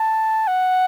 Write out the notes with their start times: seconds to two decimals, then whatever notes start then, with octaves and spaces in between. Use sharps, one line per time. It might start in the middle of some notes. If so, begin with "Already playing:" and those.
Already playing: A5
0.47 F#5